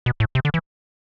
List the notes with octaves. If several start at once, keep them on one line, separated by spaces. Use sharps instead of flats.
B2
A2
C3
D3
E3